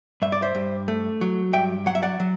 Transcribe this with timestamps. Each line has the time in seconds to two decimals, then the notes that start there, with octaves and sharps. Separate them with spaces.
0.22 G2 E5
0.32 D5
0.42 C5 E5
0.55 G2
0.88 A3
1.21 F#3
1.53 G2 E5 G5
1.86 F#3 F#5
1.95 E5
2.03 D5 F#5
2.20 F#3